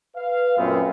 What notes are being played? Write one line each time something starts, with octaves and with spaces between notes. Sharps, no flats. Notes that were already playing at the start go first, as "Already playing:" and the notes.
B4 F5
F#2 A#2 A3 B3 C4